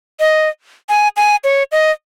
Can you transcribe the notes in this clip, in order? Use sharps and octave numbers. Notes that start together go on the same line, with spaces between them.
D#5
G#5
G#5
C#5
D#5